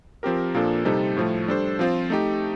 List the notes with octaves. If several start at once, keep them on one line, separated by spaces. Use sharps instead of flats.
F3 C4 G4 A#4
A#2 F3 A#3 D4 A4
C3 G3 C4 D#4 A4
A2 F3 A3
G3 D4 A4 C5
F3 C4 F4 C5
A3 D#4 G4